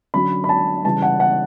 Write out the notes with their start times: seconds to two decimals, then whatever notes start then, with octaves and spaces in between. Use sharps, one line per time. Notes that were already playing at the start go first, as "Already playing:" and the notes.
0.14 D3 F#3 C#4 B5
0.44 B5
0.49 A5
0.85 C#3 E3 G3 A5
1.02 F#5
1.20 F#5